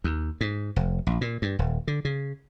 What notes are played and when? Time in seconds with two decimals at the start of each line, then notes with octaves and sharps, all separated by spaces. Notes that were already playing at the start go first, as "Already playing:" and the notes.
0.04 D#2
0.41 G#2
0.76 F1
1.07 A#1
1.21 A#2
1.42 G2
1.59 D#1
1.88 D3
2.05 C#3